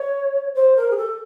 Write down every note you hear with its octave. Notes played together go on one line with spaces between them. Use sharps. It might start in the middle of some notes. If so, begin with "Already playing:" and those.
Already playing: C#5
C5
A#4
G#4
A4